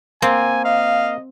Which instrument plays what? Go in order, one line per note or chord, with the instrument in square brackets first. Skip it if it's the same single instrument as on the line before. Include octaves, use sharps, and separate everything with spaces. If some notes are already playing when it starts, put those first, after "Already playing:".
[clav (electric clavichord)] A#3 [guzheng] C4 [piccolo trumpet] G#5
[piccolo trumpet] D#5 [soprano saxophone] F5